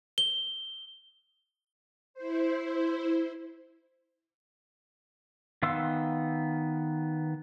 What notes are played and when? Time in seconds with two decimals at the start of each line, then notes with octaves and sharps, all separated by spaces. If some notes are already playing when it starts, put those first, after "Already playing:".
0.18 G7
2.14 E4 C5
5.63 D#3 B3 F5 C6 E6